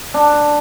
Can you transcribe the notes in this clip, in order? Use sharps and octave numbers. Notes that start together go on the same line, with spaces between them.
D4